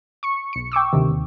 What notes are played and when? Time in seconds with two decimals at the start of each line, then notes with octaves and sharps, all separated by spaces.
0.23 C#6 C#7
0.53 B1 C#7
0.72 G5 C#6 D6 E6
0.93 D2 C3 D#3
1.11 D#2